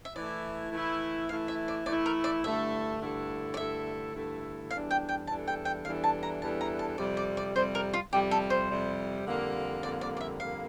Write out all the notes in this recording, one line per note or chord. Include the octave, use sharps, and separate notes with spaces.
E5
E3 A3 E4 D5
E3 A3 E4
E3 A3 E4 F5
E5
D5
E3 A3 E4 D5
A#4
D5
G2 D3 A3 E4 A4 E5
G2 D3 A3 E4 A4
D5
G2 D3 A3 E4 A4 E5
G2 D3 A3 E4 A4
E2 E3 G3 D4 A4 F5
G5
G5
E2 E3 G3 D4 A4 A5
G5
G5
E2 E3 G3 D4 A4 F5
A5
A#5
E2 E3 G3 D4 A4 A5
A#5
A5
F2 C3 G3 D5
D5
D5
F2 C3 G3 C5
A#4
F4
F2 C3 G3 G4
A4
C5
F2 C3 G3
F2 D3 G3 A#3
F2 D3 G3 A#3 D5
D5
D5
E5
F2 D3 G3 A#3 F5